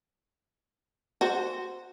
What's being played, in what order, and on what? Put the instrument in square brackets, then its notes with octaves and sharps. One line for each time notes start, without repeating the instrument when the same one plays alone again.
[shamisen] F#4 C5